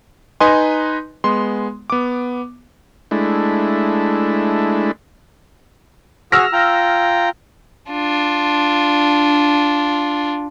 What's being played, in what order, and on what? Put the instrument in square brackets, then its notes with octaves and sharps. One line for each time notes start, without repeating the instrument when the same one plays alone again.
[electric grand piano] D#4 B4 D#5 G#5 C6
G#3 B3 C6
B3 D6
[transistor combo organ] G#3 A3 D4 E4
[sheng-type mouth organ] F#4 G#4 [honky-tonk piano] E6 F6 A#6
[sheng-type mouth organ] F4 G5 A#5
[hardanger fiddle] D4 F4